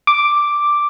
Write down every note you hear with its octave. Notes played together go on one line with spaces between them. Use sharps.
D6